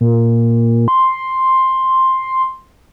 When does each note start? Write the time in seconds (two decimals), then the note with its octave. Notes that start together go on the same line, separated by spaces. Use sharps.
0.01 A#2
0.88 C6